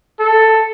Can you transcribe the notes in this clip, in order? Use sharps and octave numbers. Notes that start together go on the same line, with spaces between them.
A4